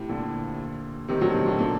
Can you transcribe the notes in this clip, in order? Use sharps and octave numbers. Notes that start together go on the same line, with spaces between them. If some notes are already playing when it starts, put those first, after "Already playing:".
Already playing: A2 C3
A#2 D3
C3 D#3
D3 F#3
C3 D#3
A#2 D3
A#2 D3